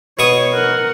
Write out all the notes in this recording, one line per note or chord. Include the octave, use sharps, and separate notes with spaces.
B2 C#5 C#6 D#6
A#4 F#5